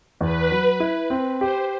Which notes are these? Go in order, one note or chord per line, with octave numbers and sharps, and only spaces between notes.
E2 B4
F#3
E4
C4
G4 C5